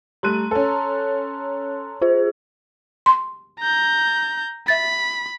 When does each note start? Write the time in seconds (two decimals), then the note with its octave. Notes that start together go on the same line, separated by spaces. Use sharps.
0.23 G3 A3 A#5 C6 F#6 D#7
0.51 C#4 A4
2.02 F4 G#4 C5
3.06 C6
3.61 A#5 G6
4.68 E5 B5 A6